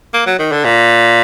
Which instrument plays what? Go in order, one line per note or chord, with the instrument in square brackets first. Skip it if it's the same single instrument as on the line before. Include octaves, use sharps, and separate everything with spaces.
[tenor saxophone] A#3
F#3
D#3
D3
A#2